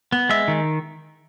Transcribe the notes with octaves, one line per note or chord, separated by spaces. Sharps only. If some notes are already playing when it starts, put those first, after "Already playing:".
B3
G#3 E5
D#3